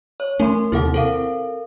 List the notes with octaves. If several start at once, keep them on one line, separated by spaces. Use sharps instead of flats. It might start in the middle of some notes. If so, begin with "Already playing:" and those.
C#5
A3 C#4 A#4 C6
D#2 C3 E4 A4 F#5
C4 A4 A#4 F5